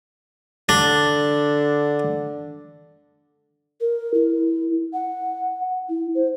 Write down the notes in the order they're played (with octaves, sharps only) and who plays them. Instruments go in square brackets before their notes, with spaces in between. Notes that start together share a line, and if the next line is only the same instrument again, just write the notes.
[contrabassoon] D3 [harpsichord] D4
[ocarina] A#4
E4
F#5
E4
C5